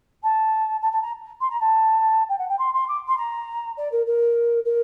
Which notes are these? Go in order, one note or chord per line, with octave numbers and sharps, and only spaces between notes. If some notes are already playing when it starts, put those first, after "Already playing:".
A5
A5
A5
A#5
C6
A#5
A5
G5
F#5
G5
C6
C6
D6
C6
A#5
D5
A#4
A#4
A#4